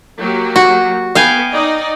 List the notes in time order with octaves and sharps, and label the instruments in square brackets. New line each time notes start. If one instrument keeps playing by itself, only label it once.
[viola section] F#3 A#3 G4
[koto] F#4
[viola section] B3 [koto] F5 G5 G#5
[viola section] D#4 D5 D#5